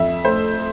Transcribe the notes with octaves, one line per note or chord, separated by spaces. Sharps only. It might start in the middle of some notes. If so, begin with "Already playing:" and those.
Already playing: F2 E5
A3 C5